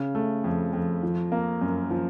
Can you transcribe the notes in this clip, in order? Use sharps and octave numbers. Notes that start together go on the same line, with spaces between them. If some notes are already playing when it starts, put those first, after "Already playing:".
Already playing: C#3
A3
F2
F2
F3
A#3
F#2
F3